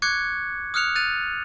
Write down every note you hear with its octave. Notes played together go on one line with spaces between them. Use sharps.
C#6 D6 F#6 G#6 C#7
D#6 F6 F#6 C#7 F7
F#6 A6 D#7 F7